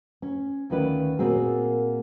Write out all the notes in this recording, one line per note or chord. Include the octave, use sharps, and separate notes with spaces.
C#4
D2 D#3 C#4 F4 B4 D5
A#2 A#3 C4 F#4 G#4